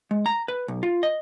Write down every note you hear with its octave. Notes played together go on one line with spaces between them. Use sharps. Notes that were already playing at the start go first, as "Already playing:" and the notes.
G#3
A#5
B4
B1
F4
D#5